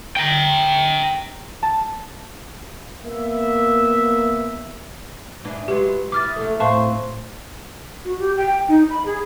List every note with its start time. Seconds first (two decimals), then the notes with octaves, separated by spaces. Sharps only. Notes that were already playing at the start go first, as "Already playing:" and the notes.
0.16 G5 A#5
1.63 A5
3.03 A#3 B3 E5
5.44 G#2 E3 D4
5.68 F#3 G#3 F4 G4 B4
6.12 E3 D6 D#6 F6 A6
6.37 F#3 A3 A4
6.60 A2 C4 B4 C5 F5 A5 C#6
8.05 F#4
8.19 G4
8.37 G5
8.68 D#4
8.90 B5
9.05 G#4